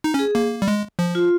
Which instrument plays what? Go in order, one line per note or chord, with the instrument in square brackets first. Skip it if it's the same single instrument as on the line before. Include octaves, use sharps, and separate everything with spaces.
[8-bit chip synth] D#4
C#4
[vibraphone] G#4
[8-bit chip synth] A#3
G3
G#3
F3
[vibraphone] F4